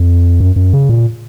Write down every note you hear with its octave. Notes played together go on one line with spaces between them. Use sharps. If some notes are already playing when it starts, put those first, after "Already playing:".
Already playing: F2
F#2
F#2
C#3
A#2